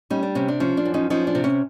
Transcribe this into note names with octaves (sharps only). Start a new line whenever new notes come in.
G3 C#4 D#4
D4
C3 C#4
D4
F3 C#4
D4
F#2
C#4 D#4
F3 C#4 D#4
D4
C3
C#4